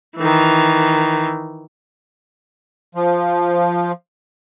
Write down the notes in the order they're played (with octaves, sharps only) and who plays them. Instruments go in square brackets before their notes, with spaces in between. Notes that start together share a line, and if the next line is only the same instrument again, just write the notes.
[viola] D#3 E3
[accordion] F3